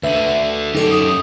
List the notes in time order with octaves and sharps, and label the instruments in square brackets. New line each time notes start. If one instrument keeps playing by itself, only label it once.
[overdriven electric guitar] D2 D3 [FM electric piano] B4 E5
[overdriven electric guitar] F#2 G4 [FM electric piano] D#4 A4
[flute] D#6